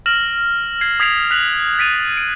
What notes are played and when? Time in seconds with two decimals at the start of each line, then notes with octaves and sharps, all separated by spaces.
0.06 F6 A#6 E7 F#7
0.81 G#6 C7
1.00 D#6 G#6 B6 C7 D7 F7
1.31 F#6 B6 C7 F7 F#7
1.78 A6 B6 D7 D#7 F7
2.17 D7